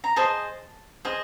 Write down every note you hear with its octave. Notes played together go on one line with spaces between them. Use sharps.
A#5
G#4 C5 D#5 A5
G#4 C5 D#5